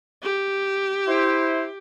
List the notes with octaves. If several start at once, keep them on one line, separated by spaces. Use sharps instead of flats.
G4
E4 C5